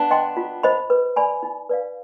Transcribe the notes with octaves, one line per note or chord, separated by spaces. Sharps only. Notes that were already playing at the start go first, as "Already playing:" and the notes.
Already playing: B3 D4
D#5 G5 C6
F4
C5 D#5 B5
B4
D5 G#5 B5
D#4
B4 D5 F5